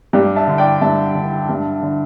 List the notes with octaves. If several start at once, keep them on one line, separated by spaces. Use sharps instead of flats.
G2 D4 G4
E5 A5
D3
D5 G5
G2 E5 A5
D3
G2
D3